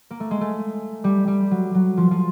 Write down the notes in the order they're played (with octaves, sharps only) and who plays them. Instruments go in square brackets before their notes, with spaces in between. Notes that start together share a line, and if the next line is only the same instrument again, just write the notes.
[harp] A#3
A3
G#3
A3
G3
G3
F#3
F#3
F3
F3